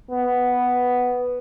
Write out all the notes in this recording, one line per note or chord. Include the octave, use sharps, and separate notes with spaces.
B3